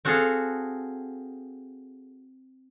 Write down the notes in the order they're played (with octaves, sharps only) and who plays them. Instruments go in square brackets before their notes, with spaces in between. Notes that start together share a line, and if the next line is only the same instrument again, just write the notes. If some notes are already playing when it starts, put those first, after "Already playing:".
[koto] C4 F#4 G#4 A4 F5